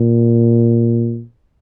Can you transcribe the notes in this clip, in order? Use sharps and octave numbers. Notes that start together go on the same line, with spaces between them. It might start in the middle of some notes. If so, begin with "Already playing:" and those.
Already playing: A#2